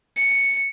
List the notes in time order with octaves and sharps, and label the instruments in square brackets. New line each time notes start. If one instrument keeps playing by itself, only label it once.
[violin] C#7